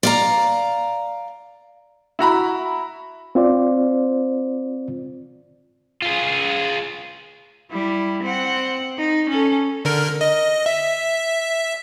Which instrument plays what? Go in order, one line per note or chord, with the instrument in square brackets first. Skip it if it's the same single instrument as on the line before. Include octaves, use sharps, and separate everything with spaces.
[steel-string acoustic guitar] D5 F5 A#5
[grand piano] E4 F#4 A#5 B5
[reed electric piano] C4 F4 C5 D5
[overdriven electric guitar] F4 G#4
[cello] G3 E4
C4 F#5
D#4
C#4 A4
[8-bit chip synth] D3 A#4
D#5
E5